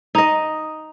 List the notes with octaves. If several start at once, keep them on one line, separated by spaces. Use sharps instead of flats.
D#4 D#5